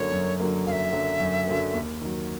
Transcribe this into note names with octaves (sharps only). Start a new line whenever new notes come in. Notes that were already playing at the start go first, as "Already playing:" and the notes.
Already playing: F#2 D3 F#3 A#3 C#5
F#2
D3 F#3 A#3
F#2 E5 F5
D3 F#3 A#3
F#2
D3 F#3 A#3
D#2
D#3 F#3